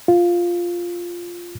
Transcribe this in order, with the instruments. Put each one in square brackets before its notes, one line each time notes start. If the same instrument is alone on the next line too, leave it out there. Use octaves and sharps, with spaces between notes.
[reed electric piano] F4